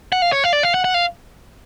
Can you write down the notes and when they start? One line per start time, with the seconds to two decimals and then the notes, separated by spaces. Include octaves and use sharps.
0.12 F#5
0.22 F5
0.32 C#5
0.44 F5
0.53 D5
0.63 F5
0.74 F#5
0.84 F#5
0.94 F5